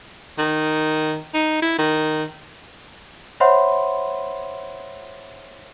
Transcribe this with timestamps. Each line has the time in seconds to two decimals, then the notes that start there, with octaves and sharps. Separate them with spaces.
0.38 D#3
1.34 D#4
1.62 E4
1.78 D#3
3.40 C5 C#5 E5 F#5 B5 C6